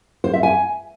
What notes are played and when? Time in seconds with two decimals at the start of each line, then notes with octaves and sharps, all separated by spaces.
0.24 C5
0.34 E5
0.43 G#5